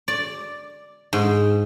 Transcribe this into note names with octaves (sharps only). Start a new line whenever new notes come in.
D5
G#2